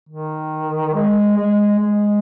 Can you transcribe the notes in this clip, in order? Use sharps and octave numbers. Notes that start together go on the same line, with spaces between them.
D#3
G#3
G#3
G#3